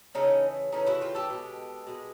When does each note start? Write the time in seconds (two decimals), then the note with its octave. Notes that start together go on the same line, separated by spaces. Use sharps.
0.15 C#3 E3 A3 C#4 D#4
0.72 C#3 E3 A3 C#4 D#4
0.86 E4 F#4
1.01 F4 G4
1.15 G4 A4
1.30 B2 G#3
1.87 B2 G#3